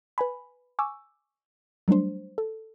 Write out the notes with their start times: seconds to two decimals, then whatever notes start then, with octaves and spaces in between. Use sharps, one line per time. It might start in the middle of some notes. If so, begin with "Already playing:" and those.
0.18 B4 G#5 B5
0.79 G#5 C#6 D6 E6
1.88 F#3 G3 A3 D4 C5
2.38 A4